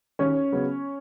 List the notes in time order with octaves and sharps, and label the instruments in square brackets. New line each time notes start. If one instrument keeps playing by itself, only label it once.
[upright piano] D#2 C#4 C#5
C#3 F#3 B3